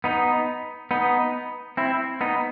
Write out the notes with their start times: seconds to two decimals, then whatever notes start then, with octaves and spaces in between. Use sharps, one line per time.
0.04 B3 D#4
0.91 B3 D#4
1.77 C4 E4
2.21 B3 D#4